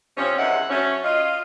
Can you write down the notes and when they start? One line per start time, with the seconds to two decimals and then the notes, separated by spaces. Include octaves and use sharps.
0.17 C3 F3 C#4
0.37 E2 G#2 D#3 E5 F#5
0.70 F#3 A3 C#4
1.04 F4 D#5